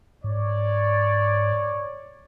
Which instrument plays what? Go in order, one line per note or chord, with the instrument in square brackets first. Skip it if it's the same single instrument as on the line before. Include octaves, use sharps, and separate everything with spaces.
[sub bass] G#2 [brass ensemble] C#5 D5